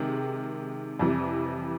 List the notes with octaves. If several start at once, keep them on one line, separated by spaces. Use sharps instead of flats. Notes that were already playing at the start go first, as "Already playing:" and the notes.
Already playing: C3 D#3 G#3
F2 C3 E3 G3